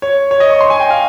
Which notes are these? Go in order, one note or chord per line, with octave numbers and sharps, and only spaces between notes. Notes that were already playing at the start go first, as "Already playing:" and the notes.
C#5
C#5
D#5
C#6
C6
G#5
G5
F5